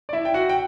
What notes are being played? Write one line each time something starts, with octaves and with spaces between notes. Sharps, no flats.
D5
E4 E5
G5
F#4 F#5
G5